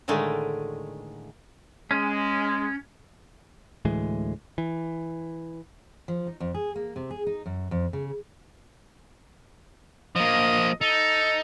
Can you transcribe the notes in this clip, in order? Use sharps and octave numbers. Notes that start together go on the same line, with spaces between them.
A2 D3 D#3 G#3 A3
G#3 C#4
D2 A2 E3 G#3
E3
F3
D#4
F2
G#4
A#3
C3
G#4
D#4
F#2
F2
C#3
F3 A#3 D#5
D#4 A4